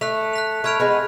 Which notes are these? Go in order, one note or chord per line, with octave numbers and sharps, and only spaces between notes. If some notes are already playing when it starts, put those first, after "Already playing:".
A3 F#6 B6 F7
F#6 B6 F7
A3 B5 F6 G#6 D7 F7
G#3 B3